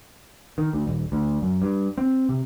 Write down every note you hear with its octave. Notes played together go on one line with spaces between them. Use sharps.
D#3
D2
D#1
D2
F#2
G2
C4
C3